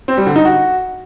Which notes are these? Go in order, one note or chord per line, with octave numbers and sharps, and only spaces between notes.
C4
G3
D3
D#4
F#4